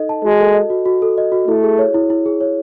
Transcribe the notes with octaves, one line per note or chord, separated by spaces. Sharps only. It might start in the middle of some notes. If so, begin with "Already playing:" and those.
Already playing: D#4 A4 D#5
A5
G#3 F#4
A4
D#5
F#4
F#4
A4
D#5
F#4
A3 E4
G#4
C#5
E4
E4
G#4
C#5